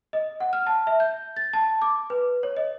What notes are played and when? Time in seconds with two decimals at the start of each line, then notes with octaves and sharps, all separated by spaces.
0.13 D#5
0.40 F#5
0.53 F6
0.67 A5
0.87 E5
1.00 G6
1.36 A6
1.53 A5
1.82 D6
2.10 B4
2.43 C#5
2.57 D#5